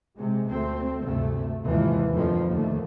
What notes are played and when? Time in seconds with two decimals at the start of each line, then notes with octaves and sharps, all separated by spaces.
0.17 C3 G#3
0.49 D2 A3 C4
1.03 D2 G2 C3 A3
1.65 D#2 G#2 C3 E3 F3
2.15 F2 A2 D3 D#3 F3
2.50 D#2 D3 A3